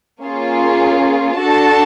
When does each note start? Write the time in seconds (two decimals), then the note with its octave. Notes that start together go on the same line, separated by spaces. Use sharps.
0.22 A#3 C#4 F4 G#4
1.40 D4 F#4 A4 A5